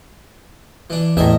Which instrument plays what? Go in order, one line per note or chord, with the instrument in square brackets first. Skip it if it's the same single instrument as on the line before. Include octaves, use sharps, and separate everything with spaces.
[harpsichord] E3 D4
[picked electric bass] E2 A2 [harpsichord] A#4 D#5 E5